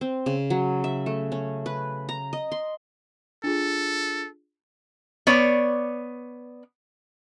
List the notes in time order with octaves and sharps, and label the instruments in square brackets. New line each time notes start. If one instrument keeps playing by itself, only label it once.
[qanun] C4
C#3
F#3
E5
A3
C#4
B4
A#5
D#5
C6
[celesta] D4 F4 G#4 [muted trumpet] A4
[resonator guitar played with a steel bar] B3 C#5 D5